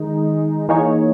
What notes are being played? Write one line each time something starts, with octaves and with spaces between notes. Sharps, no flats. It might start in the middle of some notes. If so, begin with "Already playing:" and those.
Already playing: D#3 G#3 D#4
E3 A#3 D#4 G#4 C#5